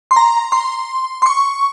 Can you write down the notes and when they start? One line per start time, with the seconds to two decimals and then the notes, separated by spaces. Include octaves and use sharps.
0.11 C6
0.16 A#5
0.52 C6
1.22 C6
1.26 C#6